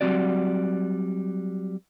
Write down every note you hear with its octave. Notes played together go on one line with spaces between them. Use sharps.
F#3 G3 C4 F#4 D5